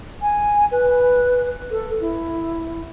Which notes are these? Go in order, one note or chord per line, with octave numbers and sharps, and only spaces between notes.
G#5
B4
A4
E4